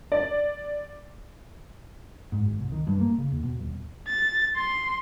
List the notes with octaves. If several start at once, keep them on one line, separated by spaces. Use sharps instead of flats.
D5
G#2
G#1
C2
D#3
G2
A#3
C#3
D#2
B2
D#1
A6
C6